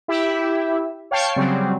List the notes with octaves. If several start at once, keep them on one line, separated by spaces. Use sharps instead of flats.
E4 G4 E5
C#5 F5 G5 A5 C#6 C7
C#3 F#3 G3 C4